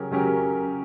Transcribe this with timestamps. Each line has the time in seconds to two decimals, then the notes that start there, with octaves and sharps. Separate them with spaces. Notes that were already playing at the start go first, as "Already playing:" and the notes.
Already playing: C#3 F#3 C#4 G4 A#4
0.11 C#3 F#3 C#4 G4 A#4